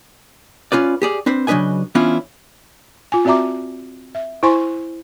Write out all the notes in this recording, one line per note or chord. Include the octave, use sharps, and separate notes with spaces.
C#4 F4 B4 D5
G4 G#4 D5
C4 D4 B4 C5
C#3 F#3 D4 B4 D#5 G#5
E3 B3 C#4 D4 E4 F4
F4 G#5
C4 F#4 D5 E5 A#5 D6
E5
E4 C5 G#5 C6 C#6